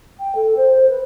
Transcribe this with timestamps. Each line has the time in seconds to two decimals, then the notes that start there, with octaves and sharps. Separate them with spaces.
0.19 G5
0.35 A4
0.57 C5
0.89 B4